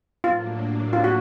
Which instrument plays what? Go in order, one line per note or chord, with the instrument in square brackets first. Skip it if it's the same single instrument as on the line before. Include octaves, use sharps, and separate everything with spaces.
[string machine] A2 F#3 A#3 D4 [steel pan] F4
[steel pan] F4
F#4